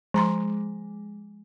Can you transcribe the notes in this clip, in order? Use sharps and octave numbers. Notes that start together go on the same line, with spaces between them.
F3 G#3 A#5 C6